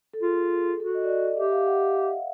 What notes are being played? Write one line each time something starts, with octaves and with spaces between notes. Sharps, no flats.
A4
F4 G#4
G#4
F#4 A4
D#5
D5
D#5
D#5
G4 E5
F5
F#5